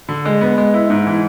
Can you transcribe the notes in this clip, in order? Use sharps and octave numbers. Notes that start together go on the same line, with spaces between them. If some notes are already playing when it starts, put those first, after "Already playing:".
D3
G#3
B3
G#3
E4
G#2
E3